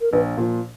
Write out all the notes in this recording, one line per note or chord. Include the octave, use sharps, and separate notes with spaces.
A#4
A#1 B4
A#2 F3